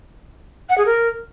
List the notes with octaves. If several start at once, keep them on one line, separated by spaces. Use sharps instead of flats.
F#5
G#4
A#4